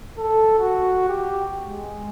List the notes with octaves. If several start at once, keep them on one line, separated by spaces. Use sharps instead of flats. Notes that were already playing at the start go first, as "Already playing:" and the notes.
A4
F#4
G4
G#3